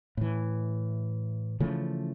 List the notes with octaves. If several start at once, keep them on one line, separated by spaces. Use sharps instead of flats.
A2 E3
C#3 E3 F3 A3